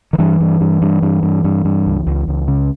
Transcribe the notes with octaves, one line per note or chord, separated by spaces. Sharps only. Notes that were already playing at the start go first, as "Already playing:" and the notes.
D#3
G2 E3
G2
G2
G2
G2
G2
G2
G2
C#2
C#2
C#2
C#3